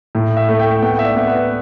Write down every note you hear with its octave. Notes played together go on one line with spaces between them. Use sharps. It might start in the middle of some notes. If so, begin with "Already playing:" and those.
A2
E5
A3
G5
B3 G5
E5
D5
B3
B4